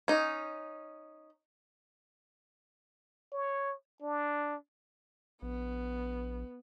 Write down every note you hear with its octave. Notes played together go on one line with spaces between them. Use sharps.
C#4 D#4
C#5
D4
A#1 B3